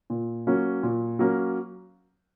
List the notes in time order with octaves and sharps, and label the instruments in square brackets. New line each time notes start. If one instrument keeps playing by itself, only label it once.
[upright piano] A#2
F#3 A#3 C#4
A#2
F#3 A#3 C#4